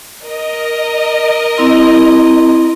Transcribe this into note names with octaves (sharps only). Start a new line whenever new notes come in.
A#4 D#5
C4 E4 C6